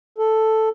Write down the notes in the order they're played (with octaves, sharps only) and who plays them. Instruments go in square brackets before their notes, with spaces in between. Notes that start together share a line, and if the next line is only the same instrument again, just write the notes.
[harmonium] A4